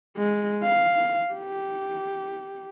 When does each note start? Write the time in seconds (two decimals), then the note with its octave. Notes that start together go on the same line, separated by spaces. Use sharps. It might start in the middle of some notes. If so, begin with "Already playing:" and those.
0.17 G#3
0.64 F5
1.34 G4